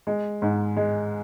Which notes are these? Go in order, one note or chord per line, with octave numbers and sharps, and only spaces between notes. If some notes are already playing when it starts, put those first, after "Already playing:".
G#3
G#2
G#3